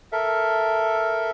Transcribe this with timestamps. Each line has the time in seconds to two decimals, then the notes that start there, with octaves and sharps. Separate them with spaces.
0.12 A4 A#4 E5